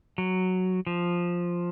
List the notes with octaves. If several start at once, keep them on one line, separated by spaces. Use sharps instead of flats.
F#3
F3